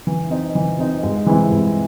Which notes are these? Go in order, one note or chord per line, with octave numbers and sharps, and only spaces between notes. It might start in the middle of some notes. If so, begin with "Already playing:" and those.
E3
C4 D#4
E3
C4 D#4
G#2
E3 G#3 C4 E4
G#2